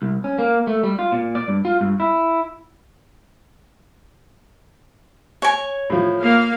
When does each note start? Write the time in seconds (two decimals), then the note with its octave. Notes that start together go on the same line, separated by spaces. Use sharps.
0.02 C2
0.24 C#4
0.38 A#3
0.67 A3
0.83 G3
0.99 F4
1.12 A#2
1.35 D5
1.48 G2
1.65 F4
1.81 G2
2.00 E4
5.42 C#5 G#5
5.90 A2 F3
6.22 A#3 F5